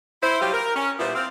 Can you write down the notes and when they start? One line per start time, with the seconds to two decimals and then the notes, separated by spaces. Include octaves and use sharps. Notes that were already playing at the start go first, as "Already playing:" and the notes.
0.22 E4 C5
0.41 F#3 G3 F4 G4
0.53 A#4
0.75 C#4
0.99 A#2 G3 B3 E4 F4 C5
1.15 C4 F5